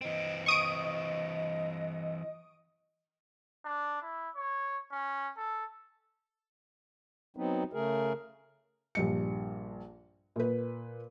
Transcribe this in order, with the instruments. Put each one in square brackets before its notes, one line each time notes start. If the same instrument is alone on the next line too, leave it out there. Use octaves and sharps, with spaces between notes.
[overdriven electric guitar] E3 C4 [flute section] D#5
[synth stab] C#6 D#6 D7
[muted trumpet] D4
E4
C#5
C#4
A4
[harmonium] F#3 B3 C4 D#4
C#3 A3 G#4 A#4
[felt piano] A#1 G2 C#7
A#2 B4